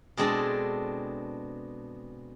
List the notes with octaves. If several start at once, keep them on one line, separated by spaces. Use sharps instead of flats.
B2 G#3 C4 D4 G#4 A4